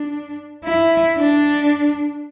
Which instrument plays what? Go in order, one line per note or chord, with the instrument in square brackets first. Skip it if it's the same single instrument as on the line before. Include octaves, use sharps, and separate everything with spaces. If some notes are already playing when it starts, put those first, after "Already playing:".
Already playing: [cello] D4
E4
D4